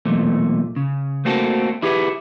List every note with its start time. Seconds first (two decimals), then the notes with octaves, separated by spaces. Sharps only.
0.05 B1 E2 A#2 A3
0.76 C#3
1.25 A3 A#3 C4 F#4 A4
1.82 E4 G4 G#4 B4 F5 F#5